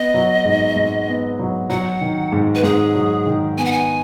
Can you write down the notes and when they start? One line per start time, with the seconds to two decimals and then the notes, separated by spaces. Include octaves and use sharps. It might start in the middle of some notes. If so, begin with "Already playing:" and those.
Already playing: B3 D#5
0.14 F#3
0.45 G#2
0.76 G#2
1.08 B3
1.39 F#3
1.70 F#3 F#5
2.01 D#3
2.32 G#2
2.55 B4
2.63 G#2 G#4
2.95 F#3
3.26 D#3
3.57 B3 G#5
3.65 F#5
3.72 G#5